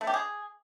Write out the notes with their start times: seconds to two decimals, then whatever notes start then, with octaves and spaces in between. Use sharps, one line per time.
0.01 A3
0.07 G4
0.14 G#4